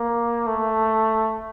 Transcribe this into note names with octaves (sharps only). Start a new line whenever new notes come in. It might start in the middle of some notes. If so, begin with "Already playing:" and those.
Already playing: A#3
A3